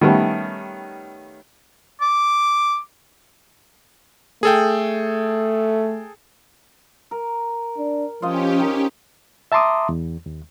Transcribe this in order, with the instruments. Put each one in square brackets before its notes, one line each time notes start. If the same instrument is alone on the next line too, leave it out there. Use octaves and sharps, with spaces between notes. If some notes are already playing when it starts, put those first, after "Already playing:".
[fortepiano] D#3 G3 A3 B3 C#4
[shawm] D6
[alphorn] A3 [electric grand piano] G#4 A4 G5
[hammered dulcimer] A#4
[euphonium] D4
[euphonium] F3 [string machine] C#4 G4 [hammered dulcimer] F4 C5 D#5
[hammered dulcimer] D#3 G#4 A#4
[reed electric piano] E5 A5 A#5 C6 D6 D#6
E2
D#2